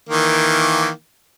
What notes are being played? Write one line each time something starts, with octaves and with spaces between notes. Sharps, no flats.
D#3 E3 A#3